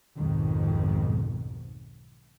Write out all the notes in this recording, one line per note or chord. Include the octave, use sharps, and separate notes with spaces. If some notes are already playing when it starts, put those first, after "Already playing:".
B1 F2 G#2 B2 D#3